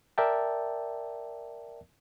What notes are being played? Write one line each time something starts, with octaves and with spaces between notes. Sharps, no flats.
A#4 D5 E5 G5 A5